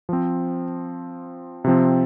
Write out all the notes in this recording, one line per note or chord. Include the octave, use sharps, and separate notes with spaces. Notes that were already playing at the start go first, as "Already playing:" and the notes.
F3 C4
C3 F3 C4